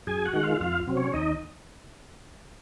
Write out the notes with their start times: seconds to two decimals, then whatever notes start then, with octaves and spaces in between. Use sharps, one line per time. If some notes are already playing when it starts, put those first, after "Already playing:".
0.07 F#2 G#4 G#5
0.25 F#4 F#5
0.33 D#3 G#3
0.43 F4 F5
0.60 F2 F4 F5
0.87 C3 F#3 C4
0.96 C#4 C#5
1.13 D#2 D#4 D#5